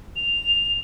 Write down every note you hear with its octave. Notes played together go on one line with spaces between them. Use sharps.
F7